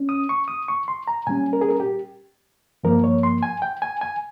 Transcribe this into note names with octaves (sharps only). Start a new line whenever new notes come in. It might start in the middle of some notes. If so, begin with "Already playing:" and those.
Already playing: C#4
D#6
C#6
D#6
C#6
C6
A#5
A#2 G3 C#4 G#5
A#4
G#4
A#4
G4
G2 F3 A#3 A#4
C#5
C6
G#5
G5
G#5
G#5